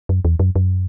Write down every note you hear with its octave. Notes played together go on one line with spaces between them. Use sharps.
F#2
E2
F#2
F#2